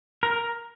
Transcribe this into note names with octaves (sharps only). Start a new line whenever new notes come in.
A#4